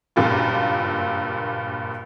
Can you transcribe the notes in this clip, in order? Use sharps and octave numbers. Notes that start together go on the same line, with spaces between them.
F#1 G2 A#2 F4